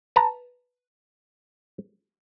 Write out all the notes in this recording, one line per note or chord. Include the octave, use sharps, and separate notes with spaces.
B4 A5 A#5